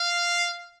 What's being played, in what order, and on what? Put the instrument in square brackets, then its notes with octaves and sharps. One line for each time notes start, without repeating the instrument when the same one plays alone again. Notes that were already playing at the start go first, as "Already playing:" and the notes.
Already playing: [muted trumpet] F5